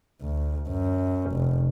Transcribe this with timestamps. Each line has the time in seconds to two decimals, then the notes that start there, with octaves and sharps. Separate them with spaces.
0.21 D2
0.68 F#2
1.31 F1